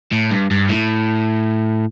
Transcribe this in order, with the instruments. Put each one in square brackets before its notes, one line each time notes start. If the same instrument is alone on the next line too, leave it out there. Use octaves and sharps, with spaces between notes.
[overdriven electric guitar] A2
G2
G2
A2